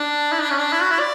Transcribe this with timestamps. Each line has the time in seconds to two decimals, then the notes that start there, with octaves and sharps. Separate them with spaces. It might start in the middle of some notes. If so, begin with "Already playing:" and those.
Already playing: D4
0.32 E4
0.41 D4
0.50 C#4
0.59 D4
0.73 E4
0.81 F#4
0.91 E4
0.99 D5